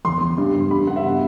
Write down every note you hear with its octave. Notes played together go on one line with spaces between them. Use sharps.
E2 C6
E2
G2
G2
G2 B5
G2 F#5
E5
B2